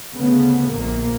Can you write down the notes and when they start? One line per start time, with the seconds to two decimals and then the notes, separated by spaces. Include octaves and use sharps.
0.15 D2 C#3 B3
0.71 A#1 A#2 A#3